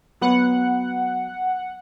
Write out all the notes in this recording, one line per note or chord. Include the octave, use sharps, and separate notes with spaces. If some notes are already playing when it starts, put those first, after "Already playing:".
F#3 B3 B4 F#5